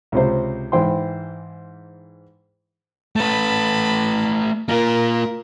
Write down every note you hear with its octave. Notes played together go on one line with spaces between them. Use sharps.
C#2 C3 C5
G#2 E3 E4 C5 G5 C6
A3 B4 A5 B5
A#3 F4 A#4